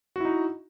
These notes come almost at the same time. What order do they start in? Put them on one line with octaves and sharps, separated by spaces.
F#4 E4 D#4